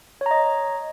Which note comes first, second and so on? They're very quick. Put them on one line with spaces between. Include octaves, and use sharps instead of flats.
C#5 A#5 D#5